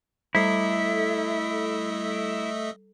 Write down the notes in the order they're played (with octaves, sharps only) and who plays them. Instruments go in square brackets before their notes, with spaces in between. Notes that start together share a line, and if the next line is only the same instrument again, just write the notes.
[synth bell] G3 A4 [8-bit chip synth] A3 D#5 E5 [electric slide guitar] E4